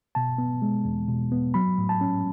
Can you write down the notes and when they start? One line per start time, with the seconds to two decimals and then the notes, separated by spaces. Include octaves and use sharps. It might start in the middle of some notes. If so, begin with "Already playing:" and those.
0.15 B2 A5
0.38 B3
0.62 G#3
0.85 E2
1.08 B2
1.32 B3
1.54 F#3 B5
1.78 A2
1.89 A5
2.01 C#4